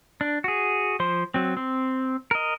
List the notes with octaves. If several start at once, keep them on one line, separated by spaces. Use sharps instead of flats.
D4
F#4 G#4
F3 C5 C6
F#3 C4
C4
A#4 D#5